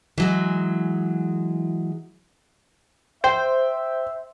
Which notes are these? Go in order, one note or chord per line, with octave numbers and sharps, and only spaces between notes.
E3 F#3 G#3
C5 E5 G5